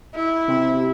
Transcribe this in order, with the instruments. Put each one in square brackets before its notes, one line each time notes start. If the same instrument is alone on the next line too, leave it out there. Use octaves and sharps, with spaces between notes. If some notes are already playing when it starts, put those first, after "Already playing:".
[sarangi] E4
[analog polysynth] C3